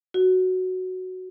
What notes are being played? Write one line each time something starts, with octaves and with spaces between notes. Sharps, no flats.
F#4